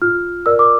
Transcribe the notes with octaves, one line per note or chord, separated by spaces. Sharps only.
F4 F6
A#4 D5 E6
D6